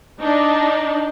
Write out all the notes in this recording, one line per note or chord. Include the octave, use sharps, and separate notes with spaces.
D4 D#4